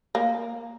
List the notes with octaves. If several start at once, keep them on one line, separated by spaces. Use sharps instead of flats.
A#3